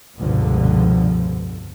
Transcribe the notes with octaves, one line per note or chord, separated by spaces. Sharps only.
F1 C#2 G2 B2 D3 F3